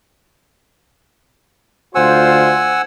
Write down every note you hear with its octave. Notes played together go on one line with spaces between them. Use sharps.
D2 F4 C5 F#5 G#5 E6